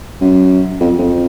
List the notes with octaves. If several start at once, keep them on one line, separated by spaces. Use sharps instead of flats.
F#2
F2
F2